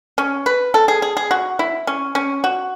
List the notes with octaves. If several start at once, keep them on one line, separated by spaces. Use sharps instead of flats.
C#4
B4
A4
G#4
G#4
G#4
F#4
E4
C#4
C#4
F#4